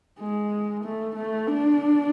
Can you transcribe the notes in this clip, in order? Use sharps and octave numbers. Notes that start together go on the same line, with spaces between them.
G#3
A3
A3
D4